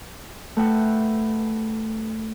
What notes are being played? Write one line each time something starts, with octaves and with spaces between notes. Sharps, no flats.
A3 B4 F#5 G5 E6